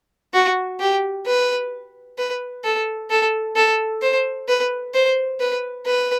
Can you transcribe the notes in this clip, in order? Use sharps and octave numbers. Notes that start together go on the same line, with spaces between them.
F#4
G4
B4
B4
A4
A4
A4
C5
B4
C5
B4
B4